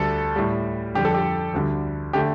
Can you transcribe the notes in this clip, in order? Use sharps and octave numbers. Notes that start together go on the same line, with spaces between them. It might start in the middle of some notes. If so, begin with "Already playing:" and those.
Already playing: D2 D3 G3 A4
A2 G3
F2 D3 G3 G4
A4
G4
D2 D3 G3
D3 A3 G4